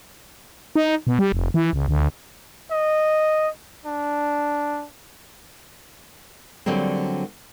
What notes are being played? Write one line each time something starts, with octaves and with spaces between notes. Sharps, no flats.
D#4
B2
G3
F1
E3
C#2
D2
D#5
D4
D3 F#3 G3 A#3 C4